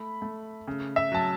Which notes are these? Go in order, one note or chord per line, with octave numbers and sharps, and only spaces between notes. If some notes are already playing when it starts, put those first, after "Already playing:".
Already playing: A3 B5
A3
C#3
E5
F#3 A5